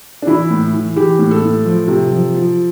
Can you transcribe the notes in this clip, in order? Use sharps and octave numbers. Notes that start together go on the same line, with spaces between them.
D4
E3 E4
A2
E3
E3 G4
A2
A4
A2
F3
C3
F3
F3